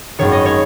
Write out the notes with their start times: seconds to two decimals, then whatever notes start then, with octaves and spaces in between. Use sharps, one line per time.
0.19 G#1 F#2 D#3 C#5
0.32 D#5
0.46 C#5